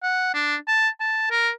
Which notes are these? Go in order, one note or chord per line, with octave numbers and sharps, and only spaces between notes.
F#5
D4
A5
A5
A#4